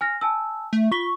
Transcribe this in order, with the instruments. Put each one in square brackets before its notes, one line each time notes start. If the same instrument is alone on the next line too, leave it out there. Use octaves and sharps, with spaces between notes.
[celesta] G#5 F6 A#6
G#5 A5 E6
[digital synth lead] A3
[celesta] F4 B6 G7 [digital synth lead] C#6